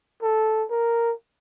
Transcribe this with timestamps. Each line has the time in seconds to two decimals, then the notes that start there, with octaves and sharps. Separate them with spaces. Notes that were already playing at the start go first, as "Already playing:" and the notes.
0.22 A4
0.70 A#4